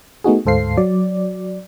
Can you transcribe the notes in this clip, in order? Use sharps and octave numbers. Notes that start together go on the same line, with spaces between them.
A3 B3 D#4 F#4 G#4
D2 G#2 A4 C5 F5 C7
F#3 D5